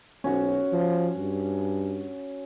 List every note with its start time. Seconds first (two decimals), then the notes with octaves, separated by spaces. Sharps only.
0.24 B1 C#4 F#4
0.73 F3
1.17 G2